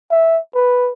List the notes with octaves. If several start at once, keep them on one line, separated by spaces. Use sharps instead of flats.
E5
B4